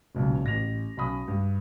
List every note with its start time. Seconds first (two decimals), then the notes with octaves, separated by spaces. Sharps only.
0.15 E1 B1 A#2 C#3
0.44 A1 A#6 F7
0.97 B1 C#4 B5 D#6
1.28 G2